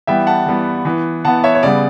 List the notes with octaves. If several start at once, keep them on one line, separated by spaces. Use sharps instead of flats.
E3 G3 B3 E5 G5
F#5 A5
E3 G3 B3
E3 B3
E3 B3 F#5 A5
C#5 E5
C#5
C#3 G3 B3 D5